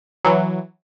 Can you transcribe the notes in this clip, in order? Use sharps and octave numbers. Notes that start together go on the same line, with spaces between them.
E3 F#3